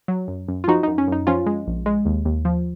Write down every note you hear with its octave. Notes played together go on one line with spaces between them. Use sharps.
F#3
F#2
F#2
F4
F3 D#4 F#4
F#2 D#4
C#4
F#2 D#4
F3 C#4 F4
G#3
A#1
G#3
D#2
D#2
F3